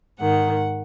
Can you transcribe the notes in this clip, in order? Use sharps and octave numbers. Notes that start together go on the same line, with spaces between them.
G#2 D#3 F#5